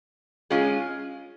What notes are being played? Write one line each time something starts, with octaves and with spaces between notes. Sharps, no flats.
G#3 C#4 F4 G#4